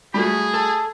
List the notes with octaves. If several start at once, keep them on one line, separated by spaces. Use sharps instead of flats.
G3 A3 F#4 G#4 B5
A4